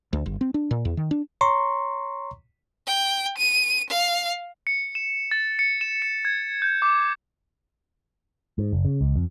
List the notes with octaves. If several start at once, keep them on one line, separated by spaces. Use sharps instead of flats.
D2
G1
C4
D4
A#2
E2
D#3
D4
C#5 A#5 C6 C#6
G5
D#7
F5
C#7
E7
A6
C#7
E7
C#7
G#6
G6
D6
G#2
F#1
C#3
C#2
F2